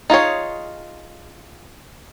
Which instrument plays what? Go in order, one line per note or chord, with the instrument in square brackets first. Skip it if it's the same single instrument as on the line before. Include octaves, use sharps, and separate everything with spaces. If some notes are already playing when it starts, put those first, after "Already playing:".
[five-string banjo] D#4 F4 G#4 C#5